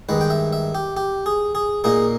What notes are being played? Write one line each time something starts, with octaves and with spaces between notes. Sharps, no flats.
G2 D#3 G#3 B4
G5
E5
E5
G4
G4
G#4
G#4
A#2 A#3 D#4 G#4